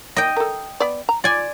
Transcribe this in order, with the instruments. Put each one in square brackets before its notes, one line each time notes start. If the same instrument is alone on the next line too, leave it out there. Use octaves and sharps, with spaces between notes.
[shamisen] A#3 [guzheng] D#5 G5
[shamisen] A4 A#4
B3 D5
A#5
[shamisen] F4 [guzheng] D5 G#5